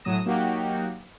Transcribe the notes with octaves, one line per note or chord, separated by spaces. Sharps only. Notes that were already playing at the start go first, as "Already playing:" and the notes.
A2 F#3 D#6 A#6 E7
F#3 A#3 D#4 F#4 G4